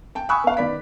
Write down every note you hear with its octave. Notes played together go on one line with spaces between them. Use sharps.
G5 A5
G#5 B5 C#6 D#6 E6 F#6
B3 F5
D#3 B3 D5 B5 B6